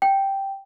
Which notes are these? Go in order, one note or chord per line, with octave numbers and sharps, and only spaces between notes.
G5